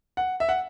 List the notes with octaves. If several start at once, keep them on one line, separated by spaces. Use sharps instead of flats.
F#5
E5
F#5